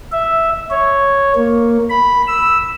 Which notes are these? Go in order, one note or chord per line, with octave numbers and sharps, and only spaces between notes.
E5
C#5
A#3
B5
E6